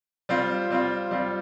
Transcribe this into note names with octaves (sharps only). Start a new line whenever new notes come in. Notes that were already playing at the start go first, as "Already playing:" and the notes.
G3 C4 F4
G3 C4 F4
G3 C4 F4